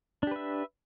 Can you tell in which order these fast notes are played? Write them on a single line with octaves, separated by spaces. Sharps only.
D4 G4 B4 E5